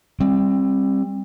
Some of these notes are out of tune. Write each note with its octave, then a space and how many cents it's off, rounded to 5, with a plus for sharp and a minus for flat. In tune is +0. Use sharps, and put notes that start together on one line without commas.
G3 +15 C4 +30